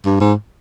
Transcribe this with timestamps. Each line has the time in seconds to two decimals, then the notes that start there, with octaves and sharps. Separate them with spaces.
0.05 G2
0.21 G#2